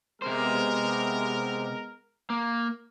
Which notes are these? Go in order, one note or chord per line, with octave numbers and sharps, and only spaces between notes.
C3 G#3 B3 A#4 C5
A#3